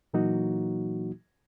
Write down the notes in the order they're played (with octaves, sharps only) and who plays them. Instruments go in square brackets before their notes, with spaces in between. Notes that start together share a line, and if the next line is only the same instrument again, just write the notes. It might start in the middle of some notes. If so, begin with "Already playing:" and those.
[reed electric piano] A#2 E3 F#3 A#3 D#4 F#4